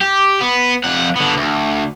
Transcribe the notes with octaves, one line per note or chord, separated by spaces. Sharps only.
G4
B3
F2 F#5
D3 B3
D2